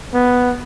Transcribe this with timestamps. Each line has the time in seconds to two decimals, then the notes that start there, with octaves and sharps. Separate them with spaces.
0.13 B3